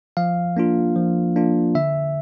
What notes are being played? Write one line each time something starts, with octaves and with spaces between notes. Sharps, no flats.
F3 F5
A#3 D4 F4
F3
A#3 D4 F4
D3 E5